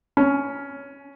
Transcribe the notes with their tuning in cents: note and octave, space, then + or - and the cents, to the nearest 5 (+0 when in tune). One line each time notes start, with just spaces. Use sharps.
C#4 +10